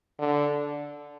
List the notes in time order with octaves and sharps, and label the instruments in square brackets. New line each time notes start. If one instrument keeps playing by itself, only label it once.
[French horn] D3